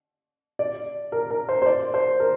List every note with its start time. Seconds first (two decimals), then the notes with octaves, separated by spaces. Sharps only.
0.59 D5
1.12 A#4
1.31 A#4
1.49 C5
1.62 C5
1.66 D5
1.94 C5
2.20 A#4